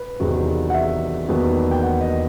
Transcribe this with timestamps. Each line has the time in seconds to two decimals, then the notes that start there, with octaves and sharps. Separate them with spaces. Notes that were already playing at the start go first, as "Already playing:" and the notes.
Already playing: B4
0.20 E1 E2 C3 D#3 F#3
0.70 F#5
0.74 E5
1.28 E1 D#2 D#3 F#3 B3
1.71 G5
1.83 F#5
2.01 D#5